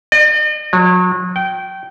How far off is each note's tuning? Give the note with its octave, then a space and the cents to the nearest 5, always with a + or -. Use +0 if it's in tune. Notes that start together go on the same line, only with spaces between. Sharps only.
D#5 -45
F#3 -35
G5 -20